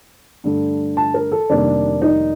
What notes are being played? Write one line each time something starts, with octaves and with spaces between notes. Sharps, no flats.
G2 D3 A3
A5
A#4
A4
F1 F2 D#3 G3 A#3 D4
D#4